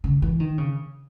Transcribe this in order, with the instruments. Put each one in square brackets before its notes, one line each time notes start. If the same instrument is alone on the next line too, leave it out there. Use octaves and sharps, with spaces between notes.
[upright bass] C#3
E3
D#3
C#3